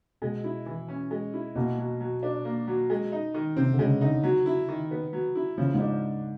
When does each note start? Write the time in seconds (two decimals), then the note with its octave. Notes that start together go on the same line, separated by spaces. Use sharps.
0.22 B2 G#3
0.44 E4
0.66 E3
0.88 C#4
1.11 G#3
1.34 E4
1.56 B2 A#3
1.78 F#3
2.00 F#3
2.23 D4
2.45 A#3
2.67 F#3
2.90 G#3
3.12 D#4
3.34 D#3
3.56 C3 C4
3.73 D3
3.79 C#3 G#3
4.01 D3 D#4
4.24 F#3
4.46 E4
4.68 D#3
4.91 B3
5.13 F#3
5.35 E4
5.58 C#3 F3
5.74 G#2
5.80 D4